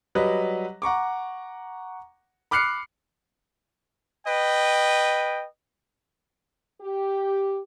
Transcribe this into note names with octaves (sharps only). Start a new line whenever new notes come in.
F#3 G3 B4 D#5
F#5 A#5 C#6 D6
B5 D6 F6 F#6 C7 C#7
B4 D#5 G5
G4